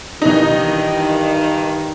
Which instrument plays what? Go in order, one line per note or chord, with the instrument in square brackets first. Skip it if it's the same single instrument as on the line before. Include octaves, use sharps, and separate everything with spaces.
[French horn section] G2 D#3 [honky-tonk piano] E3 D#4